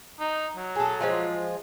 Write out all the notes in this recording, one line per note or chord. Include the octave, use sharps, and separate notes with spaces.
D#4
F#3
G#4 A4
F3 G#3 F4